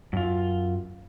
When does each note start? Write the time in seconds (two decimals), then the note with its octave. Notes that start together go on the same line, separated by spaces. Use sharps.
0.13 F#2 F4